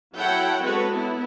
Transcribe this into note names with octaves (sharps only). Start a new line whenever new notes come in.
F#3 E4 A4 C#5 F#5 G5
G#3 C4 F#4 A4 B4 C#5
B3 E4